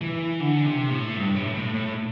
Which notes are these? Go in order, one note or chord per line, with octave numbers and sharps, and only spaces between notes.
E3
D3
C3
A2
G2
A2
A2
A2